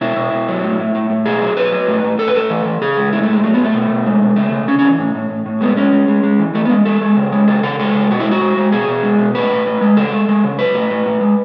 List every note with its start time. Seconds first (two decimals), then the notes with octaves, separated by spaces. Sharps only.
0.01 B2 E4
0.16 B2
0.33 B2
0.48 F#3
0.64 A2
0.78 A2
0.95 A2
1.10 A2
1.26 B2 G#4
1.42 F#3
1.57 F#3 B4
1.72 F#3
1.87 A2
2.04 A2
2.19 A2 A4
2.28 B4
2.34 A2 A4
2.50 E3
2.65 E3
2.81 C#3 G#4
2.97 G#3
3.13 A2 E4
3.23 A3
3.28 A2 G#3
3.44 F#3 A3
3.54 B3
3.59 A2
3.64 A3
3.74 B2
3.90 B2
4.06 G#3
4.21 B2
4.36 C#3 A3
4.52 C#3
4.68 C#3 C#4
4.79 C#4
4.83 E3
4.99 A2
5.15 A2
5.30 A2
5.46 A2
5.61 G#3 B3
5.76 G#3 C#4
5.92 G#3
6.08 G#3
6.23 G#3
6.39 E3
6.55 E3 A3
6.65 B3
6.70 G#3
6.85 G#3 A4
7.01 G#3
7.17 C#3
7.32 G#3
7.48 C#3 A4
7.63 C#3 A4
7.79 G#3 A4
7.95 C#3
8.10 B2 F#4
8.20 E4
8.26 G#3
8.31 F#4
8.41 G#3
8.57 G#3
8.72 B2 G#4
8.88 B2
9.03 G#3
9.19 B2
9.35 A2 B4
9.50 A2
9.66 A2
9.81 G#3
9.97 C#3 A4
10.12 G#3
10.28 G#3
10.44 C#3
10.59 F#3 B4
10.75 A2
10.90 A2
11.06 A2
11.21 G#3